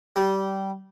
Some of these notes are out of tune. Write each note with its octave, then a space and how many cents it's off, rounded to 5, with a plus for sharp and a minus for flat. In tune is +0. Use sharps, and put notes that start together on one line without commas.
G3 -20